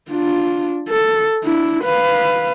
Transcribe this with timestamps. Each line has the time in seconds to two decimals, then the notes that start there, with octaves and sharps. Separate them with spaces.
0.11 D4 F4
0.89 A4
1.44 D4 E4
1.84 B4 F5